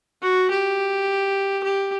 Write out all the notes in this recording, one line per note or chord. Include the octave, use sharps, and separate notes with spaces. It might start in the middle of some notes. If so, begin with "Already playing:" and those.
F#4
G4
G4